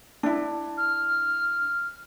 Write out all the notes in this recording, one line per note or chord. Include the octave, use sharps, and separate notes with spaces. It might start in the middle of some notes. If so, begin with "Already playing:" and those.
D4 E4
F6